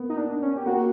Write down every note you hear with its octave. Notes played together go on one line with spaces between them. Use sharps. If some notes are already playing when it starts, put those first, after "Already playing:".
Already playing: A#3 B3
D#4
D4
C#4
G4
A#3 F#4